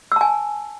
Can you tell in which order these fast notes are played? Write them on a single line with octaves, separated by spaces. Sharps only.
E6 A5 G#5